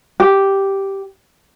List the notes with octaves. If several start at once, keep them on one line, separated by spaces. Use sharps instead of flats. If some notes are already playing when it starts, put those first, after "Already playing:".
G4